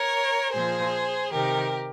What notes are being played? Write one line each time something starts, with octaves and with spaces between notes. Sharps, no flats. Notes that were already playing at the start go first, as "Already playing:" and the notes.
Already playing: A#4 C#5
A#2 F3 G#4 C5
C3 D#3 G4 A#4